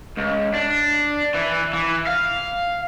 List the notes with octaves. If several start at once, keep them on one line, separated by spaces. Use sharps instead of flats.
C#2
D4
E3
E3
F5